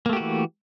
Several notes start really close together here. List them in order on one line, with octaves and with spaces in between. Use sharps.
A#3 A3 G4 F#4 E3